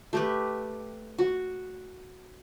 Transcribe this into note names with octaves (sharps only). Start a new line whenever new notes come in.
A3 G4 B4
F#4